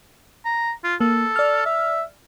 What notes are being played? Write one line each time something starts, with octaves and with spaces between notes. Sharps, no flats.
A#5
F4
A#3 A4
D5 F6
E5